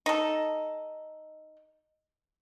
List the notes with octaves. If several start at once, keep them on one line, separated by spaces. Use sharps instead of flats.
D#4 A4